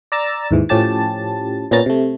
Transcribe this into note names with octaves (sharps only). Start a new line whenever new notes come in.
D5 A#5 E6 A6
D#2 G#2 E3
A2 F3 C#4 G4 A5 A6
A#2 B3 C#4 A#5 A6
C3 A3